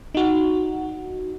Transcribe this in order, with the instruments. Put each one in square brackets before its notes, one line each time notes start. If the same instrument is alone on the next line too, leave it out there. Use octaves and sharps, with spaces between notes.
[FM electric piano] D#4 F#4